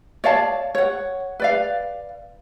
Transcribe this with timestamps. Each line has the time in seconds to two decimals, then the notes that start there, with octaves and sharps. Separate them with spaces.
0.24 C#5 D5 F5 A5
0.75 C#5 F#5
1.40 B4 D5 F5